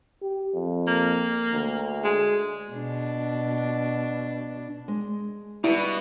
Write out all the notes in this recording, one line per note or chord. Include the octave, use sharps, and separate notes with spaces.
G4
F2
A#3
D2
G#3
B2 D4
G#3
B2 G3 E4 B4